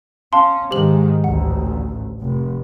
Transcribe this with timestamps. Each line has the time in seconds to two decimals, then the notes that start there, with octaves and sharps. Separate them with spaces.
0.33 C#4 F5 A5 C6
0.71 G#2 D#3 G#3 G4 C5 F#7
1.24 A1 D2 F#5
2.20 F1